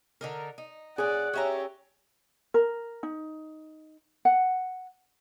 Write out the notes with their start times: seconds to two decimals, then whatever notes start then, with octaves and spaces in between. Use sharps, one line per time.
0.21 D3 D#4 A#4
0.58 D#4
0.98 A#2 C#4 G#4 D5 F#5
1.34 C#4 G4 C#5 E5 A#5
2.54 A#4
3.03 D#4
4.25 F#5